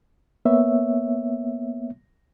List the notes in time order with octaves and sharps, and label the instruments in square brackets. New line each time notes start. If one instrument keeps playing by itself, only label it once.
[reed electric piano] A#3 B3 C#5 E5